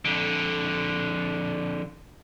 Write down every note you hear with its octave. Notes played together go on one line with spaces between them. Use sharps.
F2 D3